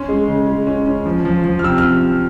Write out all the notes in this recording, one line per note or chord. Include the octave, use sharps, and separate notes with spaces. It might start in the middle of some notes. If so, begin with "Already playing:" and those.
Already playing: C#4 C6
G#3
C#3
G#3
C#4
C#4
F3
F3
F3
F6
C3 E6
F6